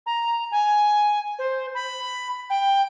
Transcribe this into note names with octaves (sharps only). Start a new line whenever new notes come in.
A#5
G#5
C5
B5
G5